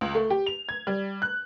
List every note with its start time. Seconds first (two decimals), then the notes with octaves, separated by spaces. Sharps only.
0.01 C#2
0.15 A3
0.30 G4
0.46 F7
0.69 G#6
0.87 G3
1.22 F#6